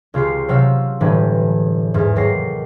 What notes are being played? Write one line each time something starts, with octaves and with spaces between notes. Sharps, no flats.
C#2 C#3 F4 G4 C7
C3 F#3 F5 E6 G6
G1 A2 E3 G3
E2 G#2
D#2 F#3 A#6 C7